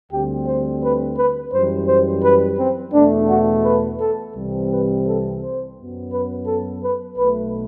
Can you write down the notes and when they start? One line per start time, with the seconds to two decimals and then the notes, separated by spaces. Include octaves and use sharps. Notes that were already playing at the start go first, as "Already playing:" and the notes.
0.11 D2 D3 G3 C4 G4
0.45 C5
0.82 B4
1.17 B4
1.52 F#2 E3 G3 C5
1.87 C5
2.23 B4
2.58 C4
2.93 E2 B2 A3 D4
3.29 F#4
3.64 B4
4.00 A4
4.35 C2 C3 E3 G3 C4
4.70 B4
5.06 A4
5.41 C5
5.77 F#2 F#3 B3
6.11 B4
6.46 A4
6.82 B4
7.18 B1 B2 A3 B4